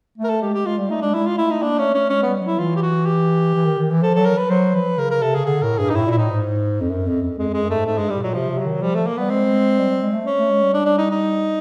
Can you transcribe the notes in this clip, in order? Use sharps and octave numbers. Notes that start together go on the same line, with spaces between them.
A3
A#4
A4
G#3 G4
G4
G#3 F4
G3
A3 D#4
G#3 D4
G#3 E4
F4
A3 E4
D#4
A#3 D4
A3 C#4
A3 C#4
G#3 C#4
G3 B3
F#3 E4
E3 F4
G4
F#4
G4
E3
D#3
D#3
E3
F3 A4
F#3 A4
A#4
B4
F#3 C5
F3 B4
C#3 A#4
A#4
C3 A4
C#3 G#4
D3 G#4
A2 A#4
G2 G#4
D#4
A2 E4
A#2
E4
A2 D#4
G#2
F2
F#2
F2
F2
F2 G#3
F2 G#3
F#2
G#2 A3
G#2 A3
G2 G#3
G#2 G3
B2
A#2 F#3
C3 F3
C3
F#3
D#3
F3 G3
A3
A#3
G3 B3
G#3 C4
G3
G3
G#3
A3
C#4
A3
G#3
G3
D4
D4
D#4
D#4